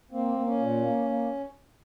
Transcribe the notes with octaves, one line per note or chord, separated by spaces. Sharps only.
A#3 C4
A#3
C#4
A#2
A#3
A#3